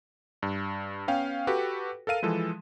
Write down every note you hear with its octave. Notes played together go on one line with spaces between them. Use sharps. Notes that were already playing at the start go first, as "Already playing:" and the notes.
G2
B3 C#4 F5 G5
F#4 G4 A4 B4
A4 A#4 F5 D#7
E3 F3 G#3 A4